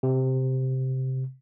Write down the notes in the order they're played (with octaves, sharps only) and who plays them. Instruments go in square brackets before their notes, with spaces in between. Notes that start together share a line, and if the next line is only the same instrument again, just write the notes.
[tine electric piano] C3